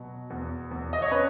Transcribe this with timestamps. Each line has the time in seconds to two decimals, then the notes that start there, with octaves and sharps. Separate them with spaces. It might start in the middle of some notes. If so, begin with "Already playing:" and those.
Already playing: B2 F#3
0.30 E2
0.71 E2
0.93 D#5
1.02 C#5
1.11 C#4 B4